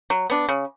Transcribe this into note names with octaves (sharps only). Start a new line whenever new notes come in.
F#3
B3 D4
C#3